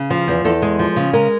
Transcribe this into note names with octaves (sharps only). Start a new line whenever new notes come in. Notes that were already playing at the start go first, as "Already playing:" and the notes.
Already playing: C#3
F3
E2
E2 A4
G#3
F3
C#3
G#3 A#4